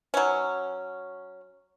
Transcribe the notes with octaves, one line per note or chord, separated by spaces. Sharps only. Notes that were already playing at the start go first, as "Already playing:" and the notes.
F#3 C#4